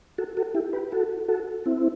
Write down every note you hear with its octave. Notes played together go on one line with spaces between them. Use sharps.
F#4 A4
F#4 A4
E4 G4
G4 B4
F#4 A4
F#4 A4
C4 E4